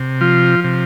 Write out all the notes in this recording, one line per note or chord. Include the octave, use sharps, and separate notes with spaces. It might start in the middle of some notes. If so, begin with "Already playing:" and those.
Already playing: C3
F3 F4
C3